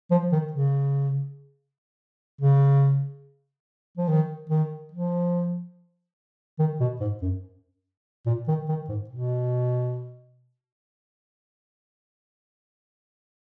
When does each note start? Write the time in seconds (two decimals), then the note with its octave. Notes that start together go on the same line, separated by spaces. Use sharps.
0.11 F3
0.32 D#3
0.52 C#3
2.41 C#3
3.97 F3
4.08 D#3
4.50 D#3
4.92 F3
6.59 D#3
6.80 B2
7.00 G#2
7.22 F#2
8.26 A#2
8.48 D#3
8.68 D#3
8.89 G#2
9.09 B2